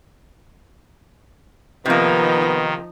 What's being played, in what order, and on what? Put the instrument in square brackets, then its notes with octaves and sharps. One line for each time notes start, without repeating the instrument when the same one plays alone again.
[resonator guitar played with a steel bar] C3 A#3 [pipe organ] D#3 [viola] F3 D#4 [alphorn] B3